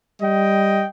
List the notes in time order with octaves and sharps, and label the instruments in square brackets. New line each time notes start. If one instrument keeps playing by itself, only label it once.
[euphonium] G3 [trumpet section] D#5 G5